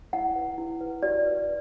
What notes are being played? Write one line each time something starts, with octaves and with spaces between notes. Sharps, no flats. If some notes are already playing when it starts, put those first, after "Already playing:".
E4 F#5
B4
E4
B4
F#4 D5
B4